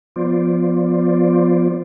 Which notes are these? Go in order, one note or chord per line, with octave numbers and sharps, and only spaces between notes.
F3 B3 F4 C5 D5